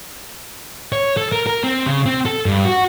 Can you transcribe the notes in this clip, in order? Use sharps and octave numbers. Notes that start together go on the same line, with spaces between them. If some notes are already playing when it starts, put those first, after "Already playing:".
C#5
A4
A#4
A#4
C4
C#3
C4
A4
G2
F#4